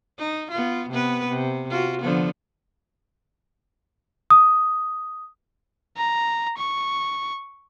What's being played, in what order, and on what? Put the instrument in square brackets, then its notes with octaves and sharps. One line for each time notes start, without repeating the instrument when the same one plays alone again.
[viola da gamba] D#4
B3 F4
C3 B3 B4
C3
F4 F#4
D3 F3 B3
[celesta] D#6
[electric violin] A#5
C#6